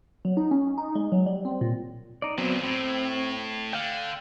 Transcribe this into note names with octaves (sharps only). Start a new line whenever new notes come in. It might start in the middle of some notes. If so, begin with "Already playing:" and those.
F#3
D#4
C#4
D#4
G#3
F#3
G3
C4
A#2
D#4 D5
F2 A#2 F#3 B3 C4
A2 C4
D3 F5 G5